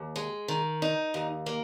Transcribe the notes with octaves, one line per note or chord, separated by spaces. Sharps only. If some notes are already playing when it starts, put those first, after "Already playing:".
Already playing: D#2
G#3
D#3
D#4
D#2
A#3